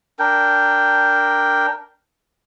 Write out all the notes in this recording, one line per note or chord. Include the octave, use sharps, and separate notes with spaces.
D4 A#4 G5